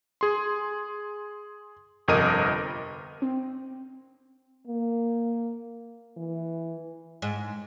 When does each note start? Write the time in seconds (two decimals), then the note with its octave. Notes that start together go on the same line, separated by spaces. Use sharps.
0.21 G#4 C6
2.08 G1 F2 C3 A#4 D#5 D#7
3.22 C4
4.67 A#3
6.17 E3
7.22 G#2